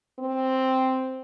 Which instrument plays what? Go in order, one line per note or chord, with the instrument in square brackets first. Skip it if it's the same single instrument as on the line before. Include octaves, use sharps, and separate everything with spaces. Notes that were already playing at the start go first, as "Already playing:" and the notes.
[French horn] C4